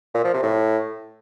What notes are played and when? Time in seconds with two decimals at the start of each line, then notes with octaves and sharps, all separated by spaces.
0.15 A#2
0.24 F3
0.34 C3
0.43 A2